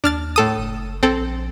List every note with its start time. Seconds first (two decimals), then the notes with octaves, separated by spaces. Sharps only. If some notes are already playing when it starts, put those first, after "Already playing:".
0.04 D#2 D4 F6 A6
0.36 A2 A4 D#6
0.58 F#1
1.03 A#1 C4 A4